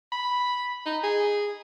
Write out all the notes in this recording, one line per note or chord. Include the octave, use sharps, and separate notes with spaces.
B5
D#4
G#4